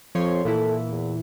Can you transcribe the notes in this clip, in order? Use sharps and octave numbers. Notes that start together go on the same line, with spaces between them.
F2 F3 C#5 C6
A#2 E3 E4 A4
E2